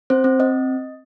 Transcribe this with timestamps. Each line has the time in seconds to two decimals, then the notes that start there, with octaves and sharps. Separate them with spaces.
0.10 C4 C5
0.24 C4
0.40 C4 D#5